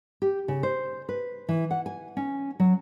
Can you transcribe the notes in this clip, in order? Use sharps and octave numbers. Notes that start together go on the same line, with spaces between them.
G4
C#3
C5
B4
E3
F#5
G#5
C#4
F#3